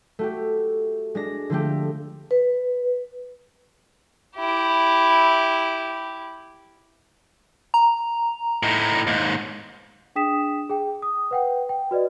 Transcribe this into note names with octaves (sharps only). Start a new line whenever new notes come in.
A3 F#4 G4
G#3 D4 A#6
D3 F3 A3 G4
B4
E4 G4
A#5
A2 D#4
D#2 G#2
D4 G#4 G5 D#6 B6 E7
G#4 G5
D#6
B4 F#5 G5
G5
F#4 B4 D5 D#5